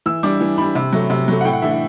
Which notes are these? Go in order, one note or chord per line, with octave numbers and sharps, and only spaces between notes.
E3 E6
G3 D4 D6
E3
G3 D4 B5
C3
F#3 A3
C3
F#3 A3
F#5
A2 G5
F#5
E3 A3 D4 E5
F#5